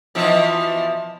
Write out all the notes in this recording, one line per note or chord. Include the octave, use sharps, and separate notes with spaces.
B2 E3 F3